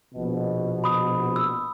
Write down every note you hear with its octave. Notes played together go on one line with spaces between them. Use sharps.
A#1 B2
B5 D#6
E6